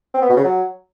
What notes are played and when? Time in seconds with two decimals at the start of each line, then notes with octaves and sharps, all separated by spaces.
0.14 C4
0.22 B3
0.29 B2
0.37 C#3
0.44 F#3